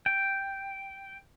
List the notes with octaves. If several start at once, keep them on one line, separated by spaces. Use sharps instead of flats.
G5